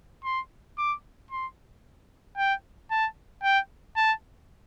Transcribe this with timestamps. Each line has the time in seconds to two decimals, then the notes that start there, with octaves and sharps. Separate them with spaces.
0.24 C6
0.78 D6
1.31 C6
2.38 G5
2.91 A5
3.43 G5
3.96 A5